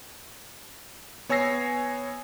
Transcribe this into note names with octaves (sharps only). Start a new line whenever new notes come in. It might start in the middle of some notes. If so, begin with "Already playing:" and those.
B3 C#5 G#5 E6 A#6 C7